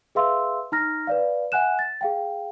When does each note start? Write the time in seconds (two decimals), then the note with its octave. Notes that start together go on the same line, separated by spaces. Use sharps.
0.15 G#4 B4 E5 F5 C6 E6
0.72 D#4 A#5 F6 A#6
1.07 B4 D5 F5
1.52 E5 F#5 G#5 F#6 E7
1.79 A6
2.01 G#4 F5 G5